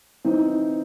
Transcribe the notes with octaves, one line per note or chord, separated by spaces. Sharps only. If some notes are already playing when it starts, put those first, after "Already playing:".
E3 C4 D#4